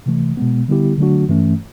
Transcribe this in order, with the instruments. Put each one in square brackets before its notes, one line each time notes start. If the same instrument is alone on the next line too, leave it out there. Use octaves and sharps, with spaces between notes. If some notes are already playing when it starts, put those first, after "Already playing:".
[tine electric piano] C3 E3 A3
B2 G#3 B3
D3 G3 B3 E4 G4
D3 F#3 A3 D4 F#4
G2 E3 A3 C#4